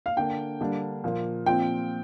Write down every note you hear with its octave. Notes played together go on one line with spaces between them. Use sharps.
F5
D3 A#3 D4 G5
D3 G3 A#3 D4
A#2 F3 A#3
A#2 F3 C4 G5